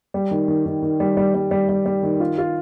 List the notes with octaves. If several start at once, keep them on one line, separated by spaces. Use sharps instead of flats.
G3
D#3
D#3
D#3
D#3
G3
G3
G3
G3
G3
G3
D#3
F4
F4